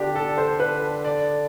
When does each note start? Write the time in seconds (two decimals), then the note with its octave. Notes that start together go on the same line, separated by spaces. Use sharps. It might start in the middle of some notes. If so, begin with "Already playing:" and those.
Already playing: D3 D4 G4
0.15 A4
0.38 C5
0.60 B4
1.05 D5